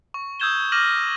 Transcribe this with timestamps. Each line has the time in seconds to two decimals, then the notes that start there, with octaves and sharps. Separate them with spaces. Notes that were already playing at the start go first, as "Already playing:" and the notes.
0.14 C#6
0.40 D#6 E6 G6 G#6 E7 G7
0.72 D6 F6 A#6 D#7 E7 F#7